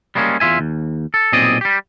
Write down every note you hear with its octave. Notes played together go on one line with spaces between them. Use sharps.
G3 G#3 A#3 C4 C#4
E2 F4 E5 G#5
D#2
A4
B1 A#2 C4 G#4 D5 D#5
G3 G4